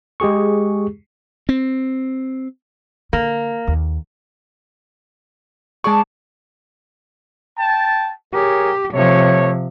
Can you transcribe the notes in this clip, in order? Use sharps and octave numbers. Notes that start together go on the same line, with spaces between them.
G#3 G4 G#4 C#6
C4
D3 A#3
D#2
G#3 G#4 D5 A5 C#6
G5 A5
G4 G#4 A#4 C#5
C3 F3 A3 C#5